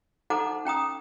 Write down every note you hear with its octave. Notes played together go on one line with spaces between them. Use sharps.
D#4 A4 C5 F#5 A#5 D6
C#4 G5 A#5 D#6